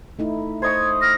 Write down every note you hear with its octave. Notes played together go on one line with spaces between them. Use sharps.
A3 D#4 E4
C5 D#5 C#6 G#6
F6 A#6